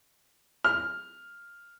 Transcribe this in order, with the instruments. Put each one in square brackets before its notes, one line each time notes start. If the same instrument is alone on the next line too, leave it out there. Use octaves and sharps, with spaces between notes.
[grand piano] F6